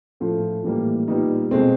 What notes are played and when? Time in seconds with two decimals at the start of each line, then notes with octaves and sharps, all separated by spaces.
0.20 A2 F3 A3
0.64 A2 E3 G3 A#3
1.08 A#2 G3 B3 D#4
1.51 B2 G#3 C4